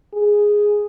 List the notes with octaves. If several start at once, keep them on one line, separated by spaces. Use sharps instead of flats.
G#4